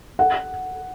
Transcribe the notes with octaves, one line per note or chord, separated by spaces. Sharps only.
F#5